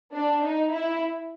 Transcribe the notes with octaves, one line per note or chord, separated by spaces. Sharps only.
D4
D#4
E4